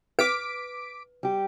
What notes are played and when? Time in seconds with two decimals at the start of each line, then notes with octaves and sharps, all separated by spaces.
0.19 B4 D6 B6 D7
1.23 G3 G4